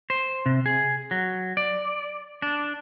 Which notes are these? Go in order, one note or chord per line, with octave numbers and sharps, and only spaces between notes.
C5
C3
G#4
F#3
D5
D4